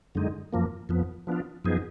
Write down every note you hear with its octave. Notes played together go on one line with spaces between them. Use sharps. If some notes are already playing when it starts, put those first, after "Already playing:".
F#2 D3 G#3 D#4
F#2 F3 A#3
F2 F3 B3
F3 B3 D4 F4
F#2 F3 B3 D#4 G#4